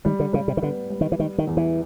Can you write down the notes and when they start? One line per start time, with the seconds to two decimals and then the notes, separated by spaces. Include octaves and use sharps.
0.05 D#3 G3
0.20 D3
0.33 C#3 G3
0.48 C3
0.57 D#3
0.62 D3 B3
0.90 G3
1.01 D#3
1.12 E3
1.19 D#3 G3
1.38 D#3
1.47 E2
1.57 E3